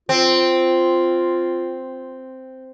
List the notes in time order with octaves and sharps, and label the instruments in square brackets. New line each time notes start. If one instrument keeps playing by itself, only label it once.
[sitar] C4 [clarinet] F4